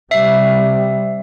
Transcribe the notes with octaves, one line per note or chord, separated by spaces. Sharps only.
C3 G3 E5 C7